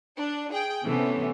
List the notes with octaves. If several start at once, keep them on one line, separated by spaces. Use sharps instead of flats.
D4
G#4 G5
C3 E3 A3 B3 C#4